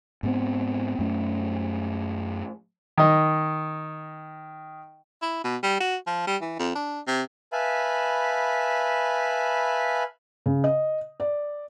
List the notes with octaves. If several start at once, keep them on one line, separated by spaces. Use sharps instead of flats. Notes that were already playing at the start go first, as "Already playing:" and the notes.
G#2 B3 C4
F#2 A3 C#4
D#3 D#5
E4
B2
G3
F#4
F3
G3
E3
F2
D4
C3
B4 E5 F5 G#5 A5 B5
C#3
D#5
D5